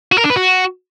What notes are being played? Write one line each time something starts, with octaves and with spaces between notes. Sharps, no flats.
F#4
A#4
D4
B4
F#4